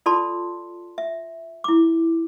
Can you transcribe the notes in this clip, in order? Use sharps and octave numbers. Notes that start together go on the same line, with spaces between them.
F4 A4 D5 A5 C6
E5
E4 D6